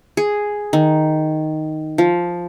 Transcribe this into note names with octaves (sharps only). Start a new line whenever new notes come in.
G#4
D#3
F3